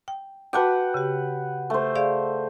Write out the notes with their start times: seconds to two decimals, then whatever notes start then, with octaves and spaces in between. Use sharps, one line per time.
0.08 G5
0.53 F#4 B4 F#5 G5 A5 D6
0.94 C#3 G4
1.70 A3 C5
1.95 G#4 D5 F5